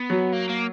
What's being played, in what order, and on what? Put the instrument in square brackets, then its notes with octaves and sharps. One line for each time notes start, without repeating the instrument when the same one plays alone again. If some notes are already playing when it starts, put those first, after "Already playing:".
Already playing: [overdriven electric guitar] B3
[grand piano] F#3
[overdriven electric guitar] A#3
A#3